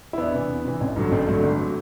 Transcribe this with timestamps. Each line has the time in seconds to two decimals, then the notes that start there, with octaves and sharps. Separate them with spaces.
0.13 E4
0.18 E2 B3 D4
0.34 C3 E3
0.49 E2
0.65 C3 E3
0.81 A1
0.96 G2 D3 F#3
1.12 A1 A3 C4
1.27 G2 D3 F#3
1.43 G1
1.61 F#3